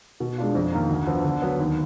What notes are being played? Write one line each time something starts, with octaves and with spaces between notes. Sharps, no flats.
B2
G#3 D4 F4
F2
D#3 A#3
D2
D3 F3 B3
D3
F#3 B3
D#2